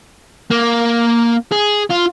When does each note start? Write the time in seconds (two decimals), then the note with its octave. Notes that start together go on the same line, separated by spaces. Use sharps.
0.51 A#3
1.52 G#4
1.90 F4